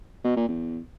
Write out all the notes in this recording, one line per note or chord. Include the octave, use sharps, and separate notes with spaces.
B2
A#2
E2